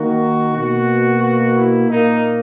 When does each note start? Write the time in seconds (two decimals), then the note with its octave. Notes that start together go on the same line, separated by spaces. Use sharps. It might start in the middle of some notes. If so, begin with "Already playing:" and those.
Already playing: D#3 A#3 F#4
0.55 B2 A#3 F#4
1.22 F#4
1.56 E4
1.88 A#2 A#3 D#4